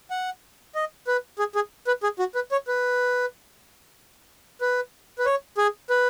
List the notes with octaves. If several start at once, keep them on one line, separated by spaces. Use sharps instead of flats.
F#5
D#5
B4
G#4
G#4
B4
G#4
F#4
B4
C#5
B4
B4
B4
C#5
G#4
B4